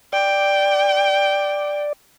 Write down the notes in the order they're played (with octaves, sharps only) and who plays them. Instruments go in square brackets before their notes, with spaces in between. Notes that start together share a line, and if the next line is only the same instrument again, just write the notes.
[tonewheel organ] D5 [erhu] G5